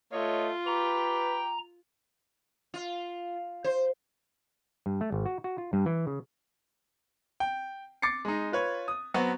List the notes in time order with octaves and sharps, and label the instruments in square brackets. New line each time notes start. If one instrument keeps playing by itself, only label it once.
[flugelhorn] A3 [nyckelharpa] F4 [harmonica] C#5 D#5
[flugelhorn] B4 [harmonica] G5 D6 [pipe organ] A#5
[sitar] F4
C5
[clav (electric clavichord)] G2
A3
G#1
F#4
F#4
F4
G2
E3
C#3
[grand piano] G5
D6 A6 C7 C#7
G#3 D#4
F4 B4 C#5
D#6
F#3 B3 C4 F#4